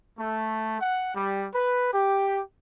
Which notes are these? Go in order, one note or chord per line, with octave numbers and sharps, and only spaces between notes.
A3
F#5
G3
B4
G4